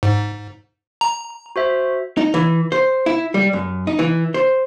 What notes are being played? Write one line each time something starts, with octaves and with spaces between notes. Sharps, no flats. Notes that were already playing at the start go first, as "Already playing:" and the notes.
G#2
A#5
F#4 C5 E5
D#4
E3
C5
E4
G3
F#2
D#4
E3
C5